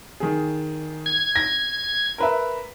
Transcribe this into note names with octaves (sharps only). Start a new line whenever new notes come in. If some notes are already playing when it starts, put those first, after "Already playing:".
D#3 G#4
G#6
A#6
A#4 B4 E5